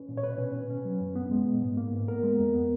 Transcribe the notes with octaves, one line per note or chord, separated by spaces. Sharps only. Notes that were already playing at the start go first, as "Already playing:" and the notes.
Already playing: C#4 B4
A#2
C#5
B2 B4
C#4
B2
C#4
F#3
F#2
B3
G#3
A#2
G#2
A#3
G#2
B3 A#4
G#3
F2
B3